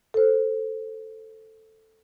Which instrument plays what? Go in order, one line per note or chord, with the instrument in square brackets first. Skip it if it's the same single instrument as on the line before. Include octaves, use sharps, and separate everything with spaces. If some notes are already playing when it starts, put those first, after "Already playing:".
[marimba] A4 C5